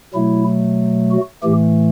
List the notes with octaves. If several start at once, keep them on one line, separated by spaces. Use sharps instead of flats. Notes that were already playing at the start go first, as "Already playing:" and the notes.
B2 F#3 A3 E4
F#4
A2 E3 A3 G4